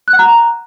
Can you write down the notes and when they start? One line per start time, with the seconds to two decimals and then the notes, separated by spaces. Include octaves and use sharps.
0.08 F#6
0.13 F#5
0.19 A#5